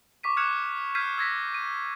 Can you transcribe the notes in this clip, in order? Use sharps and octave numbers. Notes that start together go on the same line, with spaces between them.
C#6 D6 B6 D#7
F6 F#6 G#6 C#7 E7 F7
F6 G6 G#6 B6 C7 D#7
E6 G#6 A#6 B6
D#7